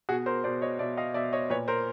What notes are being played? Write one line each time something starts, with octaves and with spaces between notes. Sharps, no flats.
B2 F#4 G#4
A#4 C5
B2 C5 D5
C#5 D#5
B2 D5 E5
D#5 F5
B2 D5 E5
C#5 D#5
A#2 B4 C#5
A#4 C5